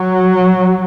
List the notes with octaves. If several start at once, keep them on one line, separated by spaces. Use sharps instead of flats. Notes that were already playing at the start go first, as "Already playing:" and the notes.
Already playing: F#3